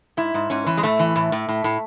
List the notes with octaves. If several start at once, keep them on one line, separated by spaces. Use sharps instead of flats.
G#2 E4
G#2
G#2 C#4
E3
G#3
A2 A3
E3
A2
A2
A2
A2